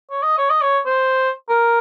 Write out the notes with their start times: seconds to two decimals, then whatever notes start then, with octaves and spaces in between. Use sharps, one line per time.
0.11 C#5
0.23 D#5
0.38 C#5
0.50 D#5
0.62 C#5
0.86 C5
1.49 A#4